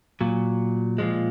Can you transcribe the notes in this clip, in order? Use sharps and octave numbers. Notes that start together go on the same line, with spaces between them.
A#2 F#3
A#2 F3 G#3